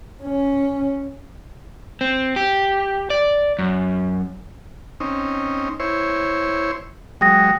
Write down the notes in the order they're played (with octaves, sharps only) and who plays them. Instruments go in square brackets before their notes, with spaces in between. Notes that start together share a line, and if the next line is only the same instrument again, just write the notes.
[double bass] C#4
[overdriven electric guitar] C4
G4
D5
F#2
[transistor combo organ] C4 C#4 D#4
E4 C5 C#5
[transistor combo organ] F#3 G#3 [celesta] G5 D#6 A#6